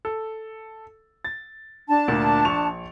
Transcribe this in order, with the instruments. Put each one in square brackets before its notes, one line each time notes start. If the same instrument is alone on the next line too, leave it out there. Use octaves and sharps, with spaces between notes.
[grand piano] A4
A6
[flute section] D4 A5
[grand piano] D2 A#2 A#3
A#1 C#6 F7